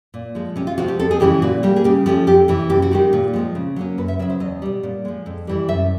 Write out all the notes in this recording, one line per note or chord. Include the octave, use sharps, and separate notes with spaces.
A#2
F3 G#3
C3 C#4
F4
F3 G#3 C4 F#4
G4
F2 A4
G#4
C#3 E3 G#3 G4
A#2 F#4
G3 A#3
G#4
C#3 G4
F3 A3 C#4 G4
F2 G4
C3 E3
F#2 G4
F#4
D#3 G#3 G4
A#2
F3 G#3 C4
C#3
F#3 A#3 C#4
F#2 B4
E5
C#3 F#3 E5
C5
E2 D#5
B2 G3
A#2
F3 G#3
F2
C3 E3 G3
F#2 E5